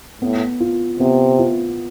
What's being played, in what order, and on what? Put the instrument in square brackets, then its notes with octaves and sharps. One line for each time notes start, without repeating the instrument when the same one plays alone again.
[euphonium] A2 [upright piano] B3
[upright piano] F4
[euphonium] C3 [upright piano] B3
[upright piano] F4